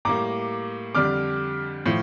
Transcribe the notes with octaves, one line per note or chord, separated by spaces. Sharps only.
A2 G3 A#3 A#5 D6
F2 D3 G3 D4 D6 F6
A2 F3